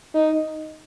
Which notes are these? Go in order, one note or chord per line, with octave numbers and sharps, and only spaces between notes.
D#4